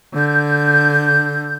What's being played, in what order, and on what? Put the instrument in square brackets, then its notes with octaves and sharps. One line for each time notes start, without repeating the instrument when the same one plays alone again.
[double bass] D3 [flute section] G6